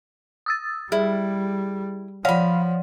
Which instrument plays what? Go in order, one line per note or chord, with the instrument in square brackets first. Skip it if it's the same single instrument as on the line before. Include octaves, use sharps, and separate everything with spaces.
[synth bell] D#6 E6 A6
[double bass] G3 [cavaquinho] E4 [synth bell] G#4
[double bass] F3 [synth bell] C#5 D5 F#5 [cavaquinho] F5 B5